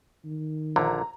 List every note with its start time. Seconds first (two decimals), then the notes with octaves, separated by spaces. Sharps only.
0.25 D#3
0.76 A#1 D3 A#5